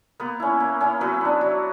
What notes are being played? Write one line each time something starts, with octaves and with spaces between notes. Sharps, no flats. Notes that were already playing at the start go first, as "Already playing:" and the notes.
A#3 B3 B4
C#4 E4
A#3
C#4 E4
F#3 B3 B4
B3 D4
F#3